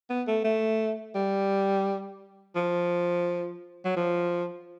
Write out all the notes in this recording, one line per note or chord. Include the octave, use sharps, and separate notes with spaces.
B3
A3
A3
G3
F3
F#3
F3